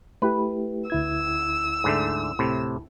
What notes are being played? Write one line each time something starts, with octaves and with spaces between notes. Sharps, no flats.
A3 E4 G4 B4
D2 E4 E6 G#6
G#2 D3 A3
A2 C3